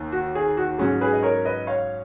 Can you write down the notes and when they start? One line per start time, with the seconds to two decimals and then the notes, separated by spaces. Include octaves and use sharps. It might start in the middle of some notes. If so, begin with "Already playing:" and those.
Already playing: D#2
0.12 F#4
0.35 G#4
0.57 F#4
0.78 G#2 F#3 C#4 G#4
1.01 G#4 B4
1.13 D#5
1.23 A#4 C#5
1.45 B4 D#5
1.67 C#5 F5